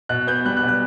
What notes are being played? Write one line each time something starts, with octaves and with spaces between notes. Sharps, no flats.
B2 F#6
B3 G6
G3 F#6
F#6
B2
F#6